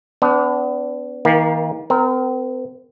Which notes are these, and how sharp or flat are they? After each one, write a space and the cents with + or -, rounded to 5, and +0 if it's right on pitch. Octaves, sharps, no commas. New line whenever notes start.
B3 +30 D4 -25
D#3 +40 A#3 +15
C4 -35 A#4 +0